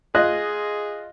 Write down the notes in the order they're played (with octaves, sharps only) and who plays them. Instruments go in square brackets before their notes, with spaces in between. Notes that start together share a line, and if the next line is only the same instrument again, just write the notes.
[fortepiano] F4 D#5 F#6 [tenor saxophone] G#4